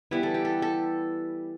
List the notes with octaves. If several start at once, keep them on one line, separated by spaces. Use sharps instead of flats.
E3 G3 B3 E4
A4
G4
A4
A4